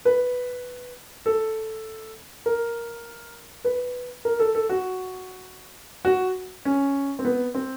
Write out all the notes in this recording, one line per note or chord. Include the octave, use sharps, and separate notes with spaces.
B4
A4
A#4
B4
A#4
A4
A4
F#4
F#4
C#4
C4
B3
C4